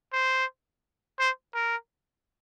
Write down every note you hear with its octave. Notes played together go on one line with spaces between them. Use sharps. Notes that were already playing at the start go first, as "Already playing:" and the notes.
C5
C5
A#4